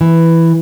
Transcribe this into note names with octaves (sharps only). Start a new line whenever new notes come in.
E3